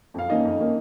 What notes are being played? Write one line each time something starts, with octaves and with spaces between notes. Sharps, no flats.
F2 F5
D#3 A#3 C#4 D#4 D#5
F2
D#3 A#3 C#4